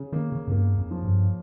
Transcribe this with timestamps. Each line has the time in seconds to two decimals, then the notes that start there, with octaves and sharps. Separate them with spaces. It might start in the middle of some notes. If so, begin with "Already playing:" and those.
Already playing: C#3
0.12 D#3 A#3
0.32 C#3
0.47 F#2
0.51 G2 A#3
0.78 F2
0.91 F3
1.05 G2